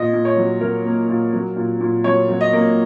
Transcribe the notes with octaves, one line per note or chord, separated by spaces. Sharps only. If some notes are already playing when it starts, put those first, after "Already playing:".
Already playing: A#2 D#5
A#2
C#5
F#3
F#3 A#4
A#3
A#2
F#3
A#2
A#2
F#3 C#5
F#3
D#5
A#3